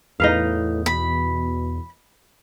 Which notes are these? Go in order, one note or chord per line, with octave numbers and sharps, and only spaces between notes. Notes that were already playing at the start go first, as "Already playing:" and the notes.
E2 A2 D#4 B4 F5
B2 B5